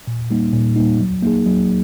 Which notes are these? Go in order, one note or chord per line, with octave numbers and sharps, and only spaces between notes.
A#2
G3 A#3 D#4
A#2
G3 A#3 D#4
F#3
A#3 D#4 G#4
F#3